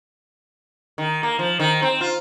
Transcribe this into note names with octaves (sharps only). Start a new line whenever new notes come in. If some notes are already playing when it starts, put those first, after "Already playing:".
D#3
A#3
F3
D#3
C4
F4